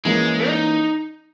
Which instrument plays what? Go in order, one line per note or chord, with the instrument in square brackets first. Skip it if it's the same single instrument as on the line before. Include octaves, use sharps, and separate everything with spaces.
[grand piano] E3 A#3 C#4 [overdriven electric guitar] G#3
[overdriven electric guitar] D#4